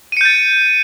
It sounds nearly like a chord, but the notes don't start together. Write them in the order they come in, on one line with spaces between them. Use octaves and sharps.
D#7 C#7 G6 A6